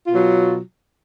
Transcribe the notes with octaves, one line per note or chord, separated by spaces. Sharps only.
B2 F#3 F4